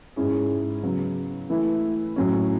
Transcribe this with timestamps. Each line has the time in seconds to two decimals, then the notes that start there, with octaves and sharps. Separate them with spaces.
0.16 G#2 G#3 C#4 E4 G#4
0.83 C#3 F#3 B3 F#4
1.50 E3 A3 E4
2.16 A2 F#3 C#4